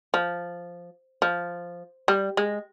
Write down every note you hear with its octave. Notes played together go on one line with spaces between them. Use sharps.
F3
F3
G3
G#3